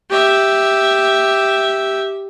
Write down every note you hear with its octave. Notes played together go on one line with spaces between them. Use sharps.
G4 E5